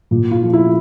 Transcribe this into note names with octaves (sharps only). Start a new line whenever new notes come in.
A#2
F4
F3
E4